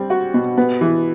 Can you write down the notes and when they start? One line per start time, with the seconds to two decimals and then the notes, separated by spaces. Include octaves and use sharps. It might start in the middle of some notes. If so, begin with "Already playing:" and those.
Already playing: G3 C4
0.10 F#4
0.34 B2
0.57 B3
0.81 E3